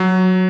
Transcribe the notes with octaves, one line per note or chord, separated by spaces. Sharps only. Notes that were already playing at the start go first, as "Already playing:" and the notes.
Already playing: F#3